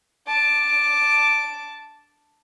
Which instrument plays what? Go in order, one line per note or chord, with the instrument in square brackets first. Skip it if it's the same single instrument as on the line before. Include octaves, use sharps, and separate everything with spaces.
[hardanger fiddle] A5 D6